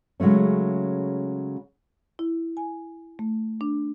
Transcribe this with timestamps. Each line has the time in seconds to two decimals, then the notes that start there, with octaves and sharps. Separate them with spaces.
0.20 C#3 F#3 G#3 A3 C#4
2.19 E4
2.57 G#5
3.19 A3
3.61 D4